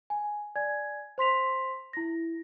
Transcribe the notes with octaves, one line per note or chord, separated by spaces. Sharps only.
G#5
D5 G#5 G#6
C5 C6 B6 F7
E4 A#6